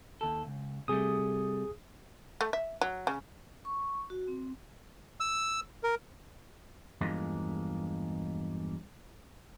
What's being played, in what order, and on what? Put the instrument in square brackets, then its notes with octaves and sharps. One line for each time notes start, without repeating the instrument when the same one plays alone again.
[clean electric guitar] D#2 A4
C#2
[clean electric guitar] C3 G3 A3 [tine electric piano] G#4 D#6
[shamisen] A3
E5
F#3
C#3
[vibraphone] C#6
F#4
C4
[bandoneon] E6
A#4
[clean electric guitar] E2 G2 F3 G#3 A#3